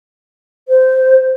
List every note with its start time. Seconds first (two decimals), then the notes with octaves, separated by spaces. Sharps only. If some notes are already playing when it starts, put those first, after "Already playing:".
0.68 C5